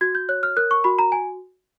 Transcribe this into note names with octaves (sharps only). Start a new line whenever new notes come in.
F#4 G#6
G6
C#5 F#6
F6
A#4 F#6
C#6
F#4 B5
A#5
G#5